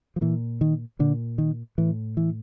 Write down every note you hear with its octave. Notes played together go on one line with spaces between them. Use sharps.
F3
A#2 E3
D#3
A#2 D3
D#3
A2 E3
E3